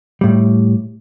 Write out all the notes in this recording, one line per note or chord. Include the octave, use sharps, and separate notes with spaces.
A2 G3